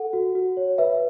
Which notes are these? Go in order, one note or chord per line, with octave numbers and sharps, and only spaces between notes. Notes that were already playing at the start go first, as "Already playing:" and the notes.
Already playing: A4 F#5
F#4
F#4
C#5
B4 E5